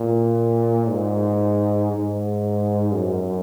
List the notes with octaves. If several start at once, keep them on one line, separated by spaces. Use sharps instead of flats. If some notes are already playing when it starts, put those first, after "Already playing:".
Already playing: A#2
G#2
G#2
F#2